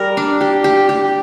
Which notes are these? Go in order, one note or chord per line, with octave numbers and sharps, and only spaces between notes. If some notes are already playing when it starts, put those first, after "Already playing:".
Already playing: G3 A#4
D4
G4
G4
G4